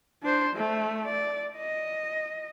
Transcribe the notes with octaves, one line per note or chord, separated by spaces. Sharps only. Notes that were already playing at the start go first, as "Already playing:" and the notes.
D4 C5
A3
D5
D#5